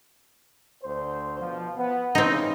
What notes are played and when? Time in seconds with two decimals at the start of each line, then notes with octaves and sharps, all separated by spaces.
0.83 D2 C5
1.39 B2 F3
1.76 B3
2.15 C#3 E3 C4 D#4